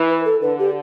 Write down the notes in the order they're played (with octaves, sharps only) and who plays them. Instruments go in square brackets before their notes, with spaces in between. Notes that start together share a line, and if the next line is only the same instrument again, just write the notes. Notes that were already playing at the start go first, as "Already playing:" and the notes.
Already playing: [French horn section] E3
[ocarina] B4
A4
[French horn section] D3 [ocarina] B4
[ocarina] G4